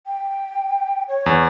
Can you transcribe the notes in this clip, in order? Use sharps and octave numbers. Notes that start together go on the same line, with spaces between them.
G5
C#5
E2